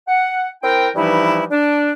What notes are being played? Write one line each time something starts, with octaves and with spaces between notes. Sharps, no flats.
F#5
C4 E4 A#4 G5
G2 E3 F3 G3 D#4 E4
D4